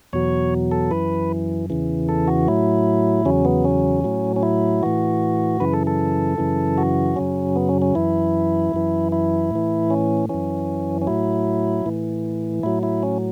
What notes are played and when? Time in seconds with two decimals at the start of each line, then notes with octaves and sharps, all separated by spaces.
0.13 E2 B2 F#3 C#5
0.71 A4
0.91 F#2 E3 B4
1.70 E2 C#3 E3
2.09 A4
2.28 F#4
2.48 A2 F#3 E4
3.25 E2 C#3 F#3 C#4
3.45 B3
3.65 C#4
4.04 A2 F#3
4.36 C#4
4.43 E4
4.83 A2 E3 F#4
5.60 F#2 C#3 E3 B4
5.73 A4
5.87 A4
6.38 F#2 C#3 E3
6.78 F#4
7.16 F#2 C#3 F#3 C#4
7.56 B3
7.69 C#4
7.82 C#4
7.95 F#2 E3 E4
8.74 F#2 E3
9.12 E4
9.51 A2 E3
9.90 C#4
10.29 F#2 E3 C#4
11.02 C#4
11.07 A2 F#3 E4
11.86 A2 E3
12.63 A2 F#3 E4
12.83 E4
13.03 C#4